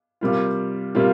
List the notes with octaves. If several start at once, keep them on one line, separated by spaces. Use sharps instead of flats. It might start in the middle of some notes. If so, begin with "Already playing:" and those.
C3 G3 A#3 F4
C3 G3 A#3 F4